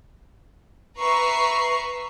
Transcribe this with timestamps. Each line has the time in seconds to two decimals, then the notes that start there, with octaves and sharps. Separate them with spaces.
0.99 B4 E5 A#5 C#6 C7